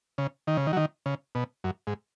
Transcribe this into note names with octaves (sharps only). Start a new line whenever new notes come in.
C#3
D#3
C#3
D#3
F#3
D#3
C#3
B2
F#2
G#2